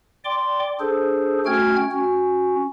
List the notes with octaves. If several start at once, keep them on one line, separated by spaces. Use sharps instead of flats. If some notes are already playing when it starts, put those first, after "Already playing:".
D5 G5 C6 D6
D4 G#4 A4 C5
A3 C#4 F#4 G5 F6 G#6
C#4 F#4